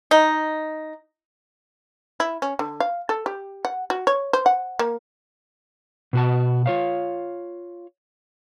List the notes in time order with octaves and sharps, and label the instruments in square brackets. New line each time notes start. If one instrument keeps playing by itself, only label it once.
[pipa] D#4
[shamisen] E4
C#4
D3
F5
A4
G4
F#5
F#4
C#5
C5
F#5
A#3
[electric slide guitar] B2 F#4 A5
F4 C#5 F5